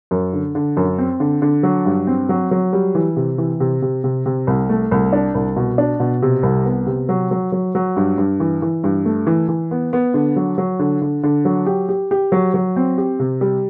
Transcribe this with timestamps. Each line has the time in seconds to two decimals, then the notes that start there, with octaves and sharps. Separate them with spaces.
0.11 F#2
0.33 D3
0.55 D3
0.77 F#2
0.98 C4
1.20 D3
1.42 D3
1.63 F#3
1.86 G2
2.07 C4
2.29 F#3
2.51 F#3
2.73 G3
2.95 E3
3.16 C3
3.38 E3
3.60 C3
3.82 C3
4.04 C3
4.26 C3
4.47 C2
4.69 A3
4.91 C2
5.13 D4
5.35 C2
5.56 B2
5.78 D4
6.00 B2
6.22 C3
6.43 C2
6.65 B3
6.87 C3
7.09 F#3
7.31 F#3
7.52 F#3
7.75 F#3
7.97 G2
8.18 G2
8.40 E3
8.62 E3
8.84 G2
9.05 A3
9.27 E3
9.48 E3
9.71 B3
9.93 B3
10.14 D3
10.36 F#3
10.58 F#3
10.79 D3
11.02 D3
11.23 D3
11.45 F#3
11.66 G4
11.89 G4
12.11 G4
12.32 F#3
12.54 F#3
12.76 C4
12.98 G4
13.19 C3
13.41 G3